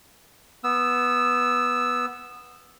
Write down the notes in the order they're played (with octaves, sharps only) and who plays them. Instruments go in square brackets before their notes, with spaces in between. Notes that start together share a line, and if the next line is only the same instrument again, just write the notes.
[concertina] B3 E6